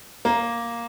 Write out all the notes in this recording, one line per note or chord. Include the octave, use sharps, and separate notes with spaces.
A#3